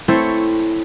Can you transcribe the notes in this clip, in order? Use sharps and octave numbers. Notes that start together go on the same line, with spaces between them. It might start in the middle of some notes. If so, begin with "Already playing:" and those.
A3 C4 E4 A4 C5 C#5